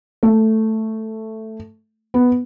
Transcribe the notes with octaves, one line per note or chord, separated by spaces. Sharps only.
A3
B3